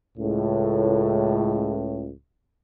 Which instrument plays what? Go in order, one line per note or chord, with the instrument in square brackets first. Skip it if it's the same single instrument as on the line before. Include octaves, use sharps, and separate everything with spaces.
[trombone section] C#2 A2